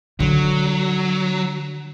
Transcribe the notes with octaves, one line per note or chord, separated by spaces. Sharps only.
D3 F#3